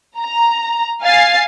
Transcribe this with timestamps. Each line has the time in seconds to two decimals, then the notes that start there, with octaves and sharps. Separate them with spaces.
0.18 A#5
1.03 F5 G#5 A6 C7